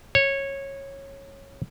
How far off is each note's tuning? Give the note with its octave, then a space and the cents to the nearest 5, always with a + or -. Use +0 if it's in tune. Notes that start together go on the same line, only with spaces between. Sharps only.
C#5 -15